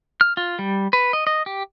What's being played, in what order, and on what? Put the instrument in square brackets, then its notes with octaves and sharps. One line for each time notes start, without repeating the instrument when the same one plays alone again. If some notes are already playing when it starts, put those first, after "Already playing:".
[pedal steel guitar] F6
F4
G3
B4
D#5
D#5
G4